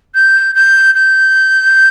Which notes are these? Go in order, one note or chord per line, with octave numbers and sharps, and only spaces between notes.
G6
G6
G6